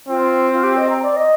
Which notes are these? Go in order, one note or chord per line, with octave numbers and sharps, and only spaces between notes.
C4 F4
F4
G4
D#5
A#5
D5
D#5